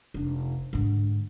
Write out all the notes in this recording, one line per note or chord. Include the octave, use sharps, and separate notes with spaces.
F1 D4
G#2 D3